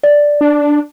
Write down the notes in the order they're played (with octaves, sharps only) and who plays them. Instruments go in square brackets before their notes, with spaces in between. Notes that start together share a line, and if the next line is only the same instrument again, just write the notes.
[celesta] D5
[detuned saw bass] D4